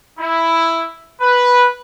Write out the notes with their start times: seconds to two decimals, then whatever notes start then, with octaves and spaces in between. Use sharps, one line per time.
0.19 E4
1.21 B4